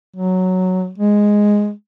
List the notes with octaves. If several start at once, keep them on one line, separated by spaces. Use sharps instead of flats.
F#3
G#3